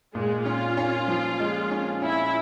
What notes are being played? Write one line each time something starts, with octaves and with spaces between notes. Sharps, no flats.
A#2 G#3
C#4 F4
C#4
F3
G#3
C#4
C#4 E4